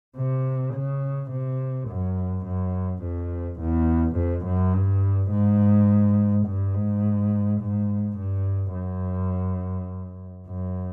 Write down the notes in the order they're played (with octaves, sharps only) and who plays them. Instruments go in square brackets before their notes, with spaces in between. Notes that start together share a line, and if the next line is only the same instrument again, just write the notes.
[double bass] C3
C#3
C3
F#2
F#2
F2
E2
F2
F#2
G2
G#2
G2
G#2
G#2
G2
F#2
F#2